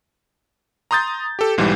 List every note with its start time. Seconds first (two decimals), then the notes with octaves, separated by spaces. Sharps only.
0.91 A#5 C6 D#6 G6 A6
1.39 G4 A4
1.58 B1 G#2 E3 G3